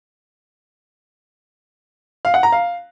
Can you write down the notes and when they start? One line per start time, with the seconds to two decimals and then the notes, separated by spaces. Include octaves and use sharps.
2.25 F5
2.34 F#5
2.43 A#5
2.52 F5